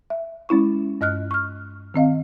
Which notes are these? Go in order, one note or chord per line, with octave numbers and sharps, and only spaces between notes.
E5
G#3 C#4 E4 C#6
G2 D#5 F6 F#6
C#6 F6
D#3 C4 D#5 F5